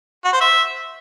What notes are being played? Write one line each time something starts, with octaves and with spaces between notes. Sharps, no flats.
F#4
C5
E5